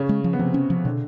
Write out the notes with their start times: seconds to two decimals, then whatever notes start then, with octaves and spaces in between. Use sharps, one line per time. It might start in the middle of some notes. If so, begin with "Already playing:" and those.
Already playing: C#3 C#4
0.09 G#3
0.24 F3
0.33 B3
0.39 C3 F3 C4
0.54 C#4
0.70 F3
0.85 B2 D3 D4